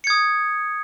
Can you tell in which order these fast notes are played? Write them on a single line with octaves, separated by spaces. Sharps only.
C#7 G#6 D#6